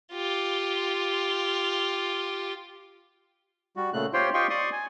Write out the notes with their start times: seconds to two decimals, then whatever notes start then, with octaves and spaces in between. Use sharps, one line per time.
0.13 F4 G4
3.76 G3 F#4
3.93 A#2 C#3 A3 F#6
4.13 F4 G4 C5 C#5 G5 C6
4.34 F4 G4 D#5 G5 C6 C#6
4.50 D5 C6 C#6 D#6
4.72 G#5